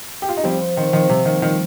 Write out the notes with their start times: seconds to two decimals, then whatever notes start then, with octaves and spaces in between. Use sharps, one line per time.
0.22 G4
0.29 F4
0.37 D#4
0.43 F3 G3 C4
0.60 C4
0.77 D#3 C4
0.93 D#3 F3
1.09 C3 G3
1.25 D#3 A#3
1.42 D#3 F4